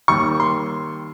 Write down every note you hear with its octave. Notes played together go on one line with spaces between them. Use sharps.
D#2 D#3 G3 C#6
C6